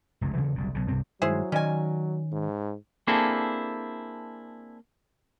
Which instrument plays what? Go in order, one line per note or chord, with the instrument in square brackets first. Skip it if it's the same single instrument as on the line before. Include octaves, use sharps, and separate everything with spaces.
[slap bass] F1 C#2 F#2
E2 C#3 E3 F3
F#1 C2 A#2
B1 C#3
C2 G2 C3 C4
[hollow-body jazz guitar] G2 D#3 G#3 [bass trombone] F#3 [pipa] E4 G#4 C5
[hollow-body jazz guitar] D#3 D5 D#5 [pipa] C#4 G#5
[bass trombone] G#2
[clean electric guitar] A#3 C4 D4 E4 G#4 A4